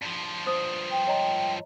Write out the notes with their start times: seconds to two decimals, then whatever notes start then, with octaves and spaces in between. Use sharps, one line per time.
0.02 G2 F3
0.46 C5 D#6
0.91 G5
1.07 C#5 D#5 A#5